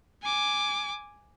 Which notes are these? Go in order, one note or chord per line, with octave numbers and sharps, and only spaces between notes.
G#5 D6